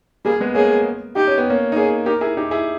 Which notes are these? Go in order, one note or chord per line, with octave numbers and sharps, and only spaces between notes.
G3 A#3 G#4
G#3 B3
A#3 C#4 G#4
D#4 G4
C#4
B3
A#3 C#4
D#4
A#3 C#4 G#4
D#4 G4 A#4
E4 G#4
D#4 G4
E4 G#4